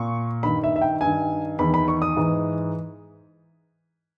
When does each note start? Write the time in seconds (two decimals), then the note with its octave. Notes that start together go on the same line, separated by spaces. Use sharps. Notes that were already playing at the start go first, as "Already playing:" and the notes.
Already playing: A#2 C#6
0.43 G2 D#3 B5
0.63 E5
0.76 E5
0.82 G5
1.01 G2 D#3 G#5
1.59 E2 D#3 B5
1.74 B5
1.88 C#6
2.02 D#6
2.17 G#2 E3